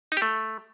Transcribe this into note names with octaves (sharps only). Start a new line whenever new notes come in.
D#4
G4
A3